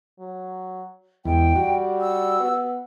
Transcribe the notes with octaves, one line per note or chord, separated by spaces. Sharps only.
F#3
E2 G#3 G5
G3 F#4
E6
B3